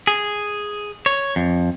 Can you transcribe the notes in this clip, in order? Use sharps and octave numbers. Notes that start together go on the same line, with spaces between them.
G#4
C#5
F2